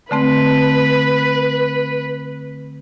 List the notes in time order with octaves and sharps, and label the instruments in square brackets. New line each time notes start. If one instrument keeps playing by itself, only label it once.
[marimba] D3 A3 C4 [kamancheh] B4